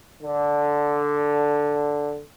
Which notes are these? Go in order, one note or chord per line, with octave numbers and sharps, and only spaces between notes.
D3